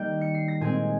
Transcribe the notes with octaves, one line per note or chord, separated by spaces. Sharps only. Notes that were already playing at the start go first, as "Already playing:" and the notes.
Already playing: D#3 G3 A#3 G5 G6
C#7
C7
A#6
A#2 G#3 C4 G#5 G#6